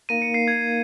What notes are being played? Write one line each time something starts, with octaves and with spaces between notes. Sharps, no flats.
A#3 D#4 A#4 F5 D#7
C#7
C7
G#6